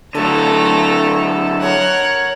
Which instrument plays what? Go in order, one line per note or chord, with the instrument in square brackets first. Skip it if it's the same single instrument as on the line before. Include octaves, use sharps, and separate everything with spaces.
[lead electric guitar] D3 F#3 [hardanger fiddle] A3 A#5 [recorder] A4
[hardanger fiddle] A#4 F#5 [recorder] C#5